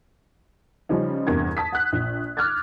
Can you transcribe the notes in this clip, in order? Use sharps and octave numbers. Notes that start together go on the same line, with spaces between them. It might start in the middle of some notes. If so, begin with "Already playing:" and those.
C#3 F3 G3 C#4 D#4
E2 G2 C3 A#4 G#6
A5 D#6 B6
F#5 F#6
A#1
D6 F6 F#6 G#6 A6